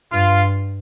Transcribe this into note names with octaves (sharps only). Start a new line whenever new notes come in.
G2 F4